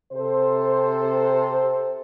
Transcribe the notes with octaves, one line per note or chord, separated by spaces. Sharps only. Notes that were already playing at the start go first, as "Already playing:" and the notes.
C3 A4 C5